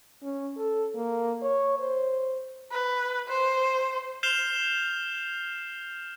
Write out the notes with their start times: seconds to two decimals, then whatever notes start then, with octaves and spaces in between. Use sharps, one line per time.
0.23 C#4
0.57 A4
0.95 A#3
1.42 C#5
1.79 C5
2.72 B4
3.29 C5
4.23 F6 G6 C7 E7 F7 G7